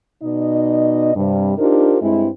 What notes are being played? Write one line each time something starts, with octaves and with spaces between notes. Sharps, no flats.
B2 D#4 D5 D#5
G2 C3 G3
D4 D#4 F4 G4 A#4 C5
G2 G#3 C4 E4